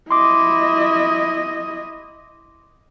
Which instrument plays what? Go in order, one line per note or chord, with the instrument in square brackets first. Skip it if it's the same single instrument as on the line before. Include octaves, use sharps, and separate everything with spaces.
[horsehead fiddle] E4 D#5 [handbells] C6 D6